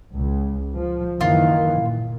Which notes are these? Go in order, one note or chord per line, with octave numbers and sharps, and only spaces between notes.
C#2
F3
F#1 D#3 E3 F4
A#2